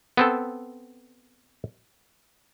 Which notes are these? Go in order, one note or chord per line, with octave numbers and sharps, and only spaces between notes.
B3 C4 A4